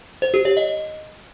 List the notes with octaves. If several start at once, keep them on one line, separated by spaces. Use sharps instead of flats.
C5
G4
C#5
D#5